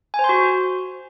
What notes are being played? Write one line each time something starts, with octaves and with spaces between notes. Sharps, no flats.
G#5
C5
C6
F#4